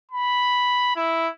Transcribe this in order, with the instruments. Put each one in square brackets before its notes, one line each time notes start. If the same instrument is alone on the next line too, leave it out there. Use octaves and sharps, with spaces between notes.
[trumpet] B5
E4